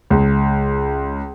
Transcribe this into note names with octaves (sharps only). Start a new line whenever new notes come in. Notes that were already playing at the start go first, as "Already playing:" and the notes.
C#2